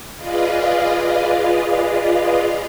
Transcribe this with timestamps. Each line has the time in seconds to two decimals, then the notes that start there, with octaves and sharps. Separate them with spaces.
0.17 F4 G#4 B4 D5 D#5 F5